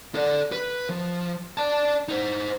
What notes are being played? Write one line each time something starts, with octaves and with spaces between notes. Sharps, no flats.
A4 D5
B4
F3
D5 A5
D#4 C5